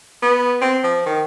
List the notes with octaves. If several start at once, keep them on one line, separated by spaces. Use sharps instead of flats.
B3
C4
F3
D#3